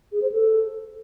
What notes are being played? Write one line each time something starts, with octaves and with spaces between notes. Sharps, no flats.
G#4
C5
A4